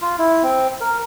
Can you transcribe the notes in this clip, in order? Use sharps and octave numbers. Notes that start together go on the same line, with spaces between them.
F4
E4
C4
A#4